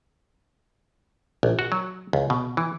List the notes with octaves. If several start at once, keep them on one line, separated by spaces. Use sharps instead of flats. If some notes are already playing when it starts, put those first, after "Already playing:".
A#1
F#4
F#3
C#2
B2
E3